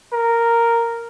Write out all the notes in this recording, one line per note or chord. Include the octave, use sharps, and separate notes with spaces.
A#4